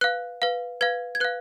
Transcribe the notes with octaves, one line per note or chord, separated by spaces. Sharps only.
B4 F5 F#6
B4 F5
B4 F5 G#6
G#6
B4 F5 F#6